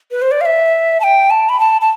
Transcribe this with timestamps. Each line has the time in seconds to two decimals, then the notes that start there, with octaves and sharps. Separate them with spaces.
0.11 B4
0.22 C5
0.31 D5
0.41 F5
0.45 E5
1.00 A5
1.04 G5
1.30 A5
1.49 B5
1.60 A5
1.81 A5